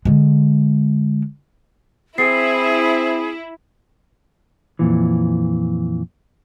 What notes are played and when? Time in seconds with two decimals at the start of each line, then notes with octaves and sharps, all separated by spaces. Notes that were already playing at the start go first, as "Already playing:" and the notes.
0.05 D3 G#3
2.18 C4 E4 G#4 C7
4.79 F2 A#2 E3